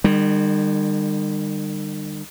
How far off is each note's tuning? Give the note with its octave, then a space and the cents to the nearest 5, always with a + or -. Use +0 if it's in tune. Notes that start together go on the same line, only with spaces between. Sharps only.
D#3 -40 G3 +25